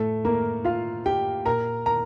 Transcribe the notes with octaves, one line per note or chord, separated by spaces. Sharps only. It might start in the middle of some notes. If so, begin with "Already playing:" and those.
Already playing: A2 A3 A4
A#3 A#4
F4 F5
G4 G5
A#2 A#4 A#5
A#4 A#5